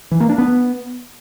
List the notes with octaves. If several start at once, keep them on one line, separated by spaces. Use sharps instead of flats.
E3
A#3
D4
B3